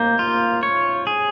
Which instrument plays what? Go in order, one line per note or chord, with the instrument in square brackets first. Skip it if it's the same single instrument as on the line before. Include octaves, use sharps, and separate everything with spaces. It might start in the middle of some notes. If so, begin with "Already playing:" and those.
Already playing: [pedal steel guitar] A#3 [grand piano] G6
[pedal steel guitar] F4
C#5
G#4